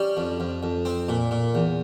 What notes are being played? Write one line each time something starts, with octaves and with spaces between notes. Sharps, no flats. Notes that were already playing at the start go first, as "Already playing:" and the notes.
Already playing: G3 C#4
F2
F2
F2
C4
A#2
A#2
E2